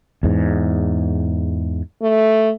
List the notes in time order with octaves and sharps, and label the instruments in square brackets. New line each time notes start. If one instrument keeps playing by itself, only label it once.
[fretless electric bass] E2 G#2
[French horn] A3